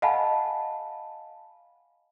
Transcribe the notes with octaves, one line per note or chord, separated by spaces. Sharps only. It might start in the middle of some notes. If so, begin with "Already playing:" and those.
D#5 F5 F#5 G#5 A5 B5